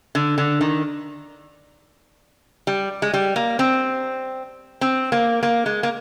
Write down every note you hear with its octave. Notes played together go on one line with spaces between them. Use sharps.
D3
D3
D#3
G3
G#3
G3
A#3
C4
C4
A#3
A#3
G#3
A#3